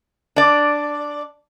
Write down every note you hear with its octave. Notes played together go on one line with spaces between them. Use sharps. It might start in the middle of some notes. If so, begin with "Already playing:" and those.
D4 D5